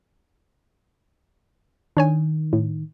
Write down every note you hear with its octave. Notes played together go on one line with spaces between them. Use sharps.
D#3 D4 C#5 G#5
A2